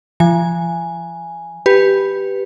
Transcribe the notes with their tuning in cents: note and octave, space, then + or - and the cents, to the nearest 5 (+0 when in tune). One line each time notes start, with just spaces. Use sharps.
F3 -40 G#5 +0
G4 +0 B4 +0